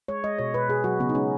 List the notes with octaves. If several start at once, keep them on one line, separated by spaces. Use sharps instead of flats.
G#3 C#5
G#3 D#5
B2 C#5
B2 B4
B2 G#4
F#3 F#4
C#3 B3
D#4
G#3 C#4